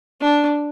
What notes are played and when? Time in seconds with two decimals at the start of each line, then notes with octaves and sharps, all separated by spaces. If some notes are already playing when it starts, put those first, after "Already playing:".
0.21 D4